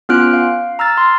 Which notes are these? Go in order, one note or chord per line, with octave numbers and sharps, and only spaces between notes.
B3 C#4 F4 F6 F#6 D7
F5
A#5 E6 F6 A6
C6